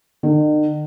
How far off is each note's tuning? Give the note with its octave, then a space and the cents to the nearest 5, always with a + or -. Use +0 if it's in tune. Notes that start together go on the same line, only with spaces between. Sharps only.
D#3 -45